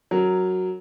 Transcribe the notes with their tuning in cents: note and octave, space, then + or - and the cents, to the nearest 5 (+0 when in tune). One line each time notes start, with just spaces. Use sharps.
F#3 +0 C#4 +0 A#4 -10